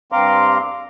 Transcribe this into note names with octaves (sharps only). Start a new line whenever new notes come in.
G2 C4 F5 A#5 C6 D6